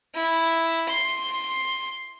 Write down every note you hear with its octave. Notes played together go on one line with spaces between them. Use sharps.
E4
C6